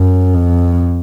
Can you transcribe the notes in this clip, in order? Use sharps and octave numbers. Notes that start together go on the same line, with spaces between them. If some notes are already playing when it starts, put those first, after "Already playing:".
Already playing: F#2
F2